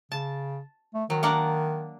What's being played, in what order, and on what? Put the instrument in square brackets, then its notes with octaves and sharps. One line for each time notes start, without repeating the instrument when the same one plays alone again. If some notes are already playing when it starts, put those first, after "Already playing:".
[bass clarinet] C#3 [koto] A5
[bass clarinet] A3
[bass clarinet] D#3 [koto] F#3
[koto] A#3 D4 F#5